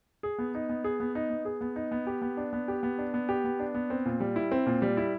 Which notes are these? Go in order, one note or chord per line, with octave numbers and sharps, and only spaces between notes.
G#4
B3
D#4
B3
G#4
B3
D#4
B3
G#4
B3
D#4
B3
G4
B3
D4
B3
G4
B3
D4
B3
G4
B3
D4
B3
C4
A#2
G3
E4
C4
A#2
G3
E4